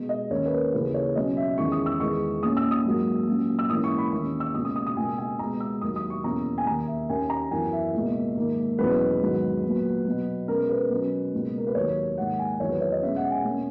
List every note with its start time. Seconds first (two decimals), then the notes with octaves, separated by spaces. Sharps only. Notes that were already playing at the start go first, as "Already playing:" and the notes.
Already playing: B2 G#3 B3
0.09 D#5
0.30 D#2 D#3 A#3 C#4 C#5
0.46 B4
0.52 A#4
0.73 D#2 C#3 E3 A#3 B4
0.94 C#5
1.15 B2 F#3 C#4 D#5
1.37 E5
1.57 E2 D#3 G#3 C#4 C#6
1.72 D#6
1.86 E6
2.00 E2 D#3 G#3 B3 C#6
2.43 A#2 A#3 C#4 D#6
2.57 E6
2.71 D#6
2.85 G#2 F#3 A#3
3.27 A#2 F#3 C#4
3.59 E6
3.70 G#2 E3 A#3 C#4 D#6
3.84 C#6
3.98 B5
4.12 D#2 D#3 A#3 C#4 C#6
4.40 E6
4.54 C#2 B2 A#3 C#4 D#6
4.65 D#6
4.76 D#6
4.87 D#6
4.97 C#2 B2 A#3 G#5
5.18 G#5
5.39 C#2 B2 G#3 B3 A#5
5.60 E6
5.81 D#2 D#3 F#3 D#6
5.96 D#6
6.10 C#6
6.24 E2 B2 A#3 C#4 A#5
6.58 G#5
6.66 D#2 D#3 A#3 A#5
6.87 E5
7.09 D#2 D#3 A#3 C#4 G#5
7.30 A#5
7.51 F#2 E3 B3 G#5
7.72 E5
7.94 C#2 B2 A#3
8.36 G#2 D#3 A#3
8.78 E2 B2 F#3 C#4 B4
9.21 G#2 D#3 F#3 B3
9.63 A#2 F#3 B3
10.06 B2 F#3 B3
10.48 B2 G#3 C#4 A#4
10.69 B4
10.90 B2 F#3 C#4
11.32 C#2 B2 A#3
11.58 A#4
11.67 B4
11.75 D#2 D#3 F#3 C#5
12.18 G#2 D#3 A#3 F#5
12.39 G#5
12.60 E2 D#3 F#3 C#5
12.70 B4
12.81 C#5
12.92 D#5
13.02 B2 G#3 C#4 E5
13.16 F#5
13.31 G#5
13.44 B2 A#3 C#4